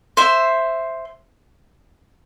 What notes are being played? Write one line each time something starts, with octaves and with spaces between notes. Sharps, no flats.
C5 E5